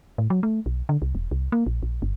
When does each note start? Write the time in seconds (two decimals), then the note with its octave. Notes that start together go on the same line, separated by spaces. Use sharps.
0.18 A2
0.30 F#3
0.43 A3
0.66 B1
0.89 D3
1.02 C2
1.15 E1
1.31 C2
1.52 A#3
1.66 A#1
1.83 A#1
2.02 G1